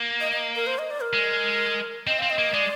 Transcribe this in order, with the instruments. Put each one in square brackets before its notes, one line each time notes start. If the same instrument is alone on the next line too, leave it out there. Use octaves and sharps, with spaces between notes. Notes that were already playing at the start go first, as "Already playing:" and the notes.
Already playing: [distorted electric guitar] A#3
[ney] D#5
D#5
A#4
C5
D#5
D5
A#4
[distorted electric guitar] G#3
[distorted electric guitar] C4 [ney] D#5
[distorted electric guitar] C4 [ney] F5
[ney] D#5
[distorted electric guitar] A#3
[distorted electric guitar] G#3 [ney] D5